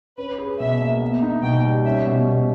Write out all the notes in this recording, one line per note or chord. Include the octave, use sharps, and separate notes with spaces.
C#4 B4
G#4
B2 E5
A#3
B3
D#4
B2 G5
G3
C#4 E5
B2
B2